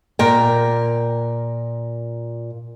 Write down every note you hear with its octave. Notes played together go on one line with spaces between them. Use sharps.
A#2 A#4 G5